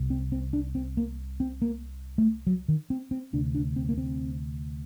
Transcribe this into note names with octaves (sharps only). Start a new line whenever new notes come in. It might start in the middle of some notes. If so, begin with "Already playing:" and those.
Already playing: C2 C3
C4
C4
D4
C4
A#3
C4
A#3
A3
F#3
D#3
C4
C4
D2 C3 D4
D4
C4
A#3
C4